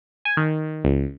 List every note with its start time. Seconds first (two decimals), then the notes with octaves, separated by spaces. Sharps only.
0.25 G#5
0.37 D#3
0.84 C#2